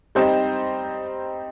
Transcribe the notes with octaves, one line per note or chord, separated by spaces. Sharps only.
G3 C4 D#4 C5 D#5